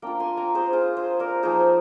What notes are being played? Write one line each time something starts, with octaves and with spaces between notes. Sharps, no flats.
A#3 D4 F4 G5 A#5
G#5 C6
G5 A#5
G#4 C5
F4 G#4
G#4 C5
A#4 D5
F3 A#3 D#4 G#4 C5